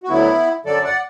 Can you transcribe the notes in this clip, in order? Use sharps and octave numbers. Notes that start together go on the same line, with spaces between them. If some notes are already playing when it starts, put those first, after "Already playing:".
F#4
D2 D3 F#3 B3 E4
F#2 D3 F#3 A4 D5
D5 F#5